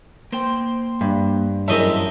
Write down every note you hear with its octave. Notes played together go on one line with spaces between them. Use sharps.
A#3 C5 G5
G2
F#2 A2 G#3 A#4 C5 D#5 E5 A5